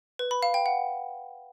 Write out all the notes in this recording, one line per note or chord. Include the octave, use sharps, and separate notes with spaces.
B4
B5
F5
G5
F#5